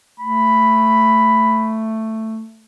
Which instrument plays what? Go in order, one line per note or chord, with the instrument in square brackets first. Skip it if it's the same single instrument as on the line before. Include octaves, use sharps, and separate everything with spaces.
[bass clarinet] A3 [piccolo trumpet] B5